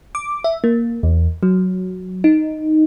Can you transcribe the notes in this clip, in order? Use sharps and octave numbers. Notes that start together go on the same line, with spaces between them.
D6
E5
A#3
E2
F#3
D#4